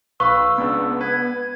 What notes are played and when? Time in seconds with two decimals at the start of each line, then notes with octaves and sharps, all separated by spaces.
0.20 B1 B4 F5 B5 C#6 E6
0.58 C#2 B3 D4
1.01 B4 G#6